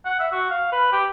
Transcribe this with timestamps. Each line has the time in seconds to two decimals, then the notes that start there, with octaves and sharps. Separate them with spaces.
0.05 F#5
0.20 E5
0.32 F#4
0.51 F5
0.72 B4
0.93 G4